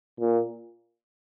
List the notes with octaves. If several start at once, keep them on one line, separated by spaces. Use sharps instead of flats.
A#2